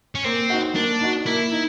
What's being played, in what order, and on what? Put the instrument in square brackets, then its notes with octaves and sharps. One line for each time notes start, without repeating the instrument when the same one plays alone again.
[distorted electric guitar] C#4
[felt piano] A#3 [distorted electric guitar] C4
[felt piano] D#4 F#4
[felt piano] A#3 [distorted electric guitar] D4
[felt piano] D#4 F#4
[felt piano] A#3 [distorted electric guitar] E4
[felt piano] D#4